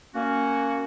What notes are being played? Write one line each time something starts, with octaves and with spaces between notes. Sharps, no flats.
A#3 C#4 F#4